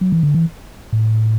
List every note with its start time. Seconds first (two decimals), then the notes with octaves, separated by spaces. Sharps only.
0.01 F#3
0.12 E3
0.23 D3
0.34 E3
0.93 A2